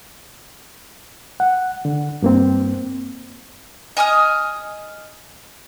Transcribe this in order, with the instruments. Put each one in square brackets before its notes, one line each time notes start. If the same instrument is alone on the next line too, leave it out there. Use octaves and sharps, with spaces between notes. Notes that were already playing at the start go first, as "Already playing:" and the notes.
[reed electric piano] F#5
D3
G2 A#3 C4
[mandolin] D#5 G#5 D#6 F6